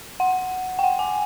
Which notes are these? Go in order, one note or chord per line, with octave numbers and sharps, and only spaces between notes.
F#5
G5
F#5
G#5